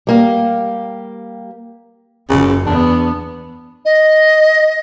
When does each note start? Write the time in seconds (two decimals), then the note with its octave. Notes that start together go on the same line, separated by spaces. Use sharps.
0.07 G3 A#3 G4
2.29 F#1 C#3
2.66 E2 B3 D4
3.85 D#5